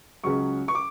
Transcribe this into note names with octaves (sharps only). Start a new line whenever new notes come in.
C#2 C#3 F#3 C#6
C#6
D6